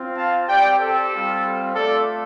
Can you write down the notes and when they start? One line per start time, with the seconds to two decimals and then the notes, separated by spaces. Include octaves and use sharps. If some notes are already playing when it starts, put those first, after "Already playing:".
Already playing: C4 F4
0.16 F5 A5
0.48 C4 G4 D5 G5
0.80 A4
1.11 G3 C4 F4
1.75 A3 F4 A4 D5